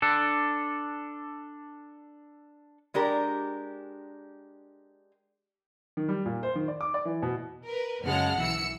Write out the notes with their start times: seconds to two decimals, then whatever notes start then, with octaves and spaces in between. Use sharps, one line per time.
0.02 D4 A4
2.94 G#3 D4 G4 A#4
5.97 D#3
6.09 G3
6.26 A#2
6.43 C5
6.55 D#3
6.68 D5
6.81 D6
6.94 D5
7.05 E3
7.22 B2
7.64 A#4 B4
8.04 F#2 C#3 G#3 F#5 A5 F6
8.38 B1 E3 E4 E6 C#7